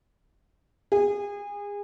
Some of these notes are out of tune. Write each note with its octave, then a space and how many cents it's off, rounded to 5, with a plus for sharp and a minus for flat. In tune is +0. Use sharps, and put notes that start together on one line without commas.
G#4 -30